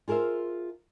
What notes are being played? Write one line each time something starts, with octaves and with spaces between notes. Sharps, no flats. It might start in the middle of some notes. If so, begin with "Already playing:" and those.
F4 G#4 A#4 C5 E5